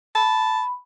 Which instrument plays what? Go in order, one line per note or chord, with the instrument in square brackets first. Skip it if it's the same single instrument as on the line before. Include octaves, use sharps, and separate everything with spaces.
[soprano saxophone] A5 [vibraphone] B5